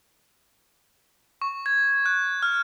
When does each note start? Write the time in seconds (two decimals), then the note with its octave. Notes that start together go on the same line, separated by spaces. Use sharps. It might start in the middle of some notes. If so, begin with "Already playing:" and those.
1.42 C#6
1.66 G#6
2.06 F#6
2.43 F6